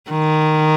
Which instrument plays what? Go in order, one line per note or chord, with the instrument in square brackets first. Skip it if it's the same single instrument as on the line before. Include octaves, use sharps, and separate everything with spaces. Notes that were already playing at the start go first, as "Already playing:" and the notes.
[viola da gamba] D#3